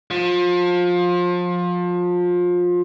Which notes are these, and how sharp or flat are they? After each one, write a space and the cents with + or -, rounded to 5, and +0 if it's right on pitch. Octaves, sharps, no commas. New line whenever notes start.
F3 +25